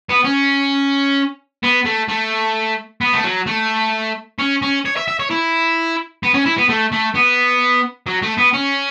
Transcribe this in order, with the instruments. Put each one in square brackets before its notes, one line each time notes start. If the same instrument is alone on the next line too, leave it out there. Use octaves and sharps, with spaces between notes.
[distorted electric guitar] B3
C#4
B3
A3
A3
B3
A3
F#3
A3
C#4
C#4
C#5
E5
E5
C#5
E4
B3
C#4
E4
B3
A3
A3
B3
F#3
A3
B3
C#4